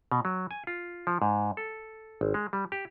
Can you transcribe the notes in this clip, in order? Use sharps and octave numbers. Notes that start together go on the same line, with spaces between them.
B2
F#3
G#5
F4
F3
G#2
A4
G#1
G#3
G3
G4